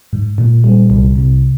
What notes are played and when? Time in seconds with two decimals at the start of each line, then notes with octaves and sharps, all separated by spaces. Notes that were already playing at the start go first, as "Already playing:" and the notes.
0.13 G#2
0.38 A#2
0.64 G3
0.90 C2
1.15 C3